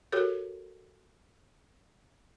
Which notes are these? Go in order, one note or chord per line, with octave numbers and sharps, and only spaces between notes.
F#4 G4 A4 A#4 C#5